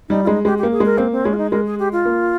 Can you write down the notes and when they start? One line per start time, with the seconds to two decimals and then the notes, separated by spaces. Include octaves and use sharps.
0.09 G3 D#4
0.24 F4
0.27 G#3 D#4
0.45 G#3 G4
0.58 G4
0.63 A#3
0.72 G#4
0.80 G#3
0.85 A#4
0.98 A#3 C4
1.12 C4
1.25 G#3 C#4
1.33 F4
1.38 D#4
1.51 G#3 A#4
1.66 G#4
1.79 G4
1.93 F4
2.05 A#3